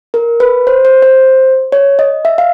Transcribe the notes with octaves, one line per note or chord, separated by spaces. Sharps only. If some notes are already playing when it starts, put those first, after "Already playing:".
A#4
B4
C5
C5
C5
C#5
D#5
E5
F5